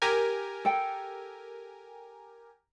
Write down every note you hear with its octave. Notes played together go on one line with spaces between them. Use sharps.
G4 A#4 G#5
A4 G5